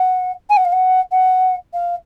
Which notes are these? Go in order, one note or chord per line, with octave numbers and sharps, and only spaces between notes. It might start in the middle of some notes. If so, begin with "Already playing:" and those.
Already playing: F#5
G#5
F#5
F5
F#5
F#5
F5